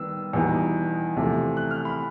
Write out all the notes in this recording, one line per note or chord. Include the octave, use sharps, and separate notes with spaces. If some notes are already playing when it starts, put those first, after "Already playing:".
Already playing: D#3 G3 B3 E6
E2 B2 G3 B3 D#4
E2 C3 F3 A3
F#6
F6
B5